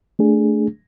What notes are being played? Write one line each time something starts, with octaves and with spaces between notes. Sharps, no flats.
A3 D4 G#4